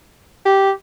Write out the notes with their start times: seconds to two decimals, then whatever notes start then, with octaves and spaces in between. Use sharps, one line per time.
0.46 G4